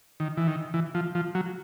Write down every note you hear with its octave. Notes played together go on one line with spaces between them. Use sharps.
D#3
E3
D#3
E3
F3
F3
F#3